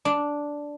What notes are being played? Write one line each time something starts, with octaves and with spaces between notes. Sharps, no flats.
D4